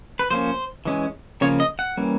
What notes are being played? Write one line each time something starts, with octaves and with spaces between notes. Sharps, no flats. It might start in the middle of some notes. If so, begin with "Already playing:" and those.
B4
F3 A#3 C#4 C5
E3 G#3 C#4
C#3 F3 A#3 C#4 C#5
D#5
F#5
E3 G3 A#3 C#4